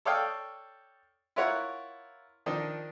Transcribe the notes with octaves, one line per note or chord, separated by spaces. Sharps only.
A4 C#5 D5 F5 G5 D#6
E4 F4 A#4 C#5 F#5
D#3 F3 D4 D#4